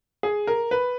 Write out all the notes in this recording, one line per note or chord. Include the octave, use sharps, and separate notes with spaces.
G#4
A#4
B4